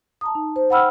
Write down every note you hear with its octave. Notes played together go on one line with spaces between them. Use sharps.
A5 A#5 D#6
D#4
C5
F#5 G5 B5 E6 F6